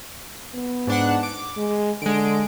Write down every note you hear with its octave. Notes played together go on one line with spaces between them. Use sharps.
B3
G#2 D4 F#5
D6
G#3
D3 G#3 D7